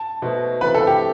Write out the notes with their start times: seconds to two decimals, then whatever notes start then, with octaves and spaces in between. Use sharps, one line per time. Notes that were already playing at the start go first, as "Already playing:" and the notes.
Already playing: A5
0.22 B2 A3 D#4 F#4 C5
0.61 E3 A3 C4 F#4 B4
0.75 A4
0.87 G4